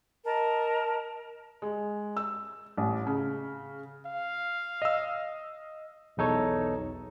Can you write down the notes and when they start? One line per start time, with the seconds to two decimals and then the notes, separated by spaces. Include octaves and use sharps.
0.24 A#4 D#5 A5
1.62 G#3
2.17 E6
2.77 A1
3.07 C#3
4.06 F5
4.82 D#5 E6
6.17 B1 E2 D#4 A4 C#5